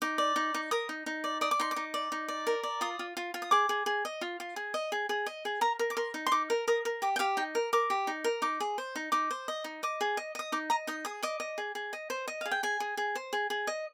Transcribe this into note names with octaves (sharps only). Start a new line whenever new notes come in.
D#4 D6
D5
D#4
D#4
A#4 D#6
D#4
D#4
D5
D5 D#6
D6
D#4 C6
D6
D#4
D5
D#4
D5
A#4
D5
F4 D#6
F4
F4
F4
D#6
G#4 D6
G#4
G#4
D#5
F4
F4
G#4
D#5
G#4
G#4
D#5
G#4
A#4 A#5
A#4
D6
A#4 C6
D#4
C6
D#4 D6
A#4
A#4 D#6
A#4
G4 D6
G5
G4 F5
D#4 G5
A#4
A#4 D6
G4
D#4
A#4
D#4 D6
G#4
C5
D#4
D#4 D6
C5
D#5
D#4
D#5 D6
G#4
D#5
D#5 D#6
D#4 D6
D#5 A#5
D#4 D#6
G#4 D#6
D#5 D6
D#5
G#4
G#4
D#5
C5
D#5
G#4 F5
G5
G#4 G#5
G#4
G#4
C5
G#4
G#4
D#5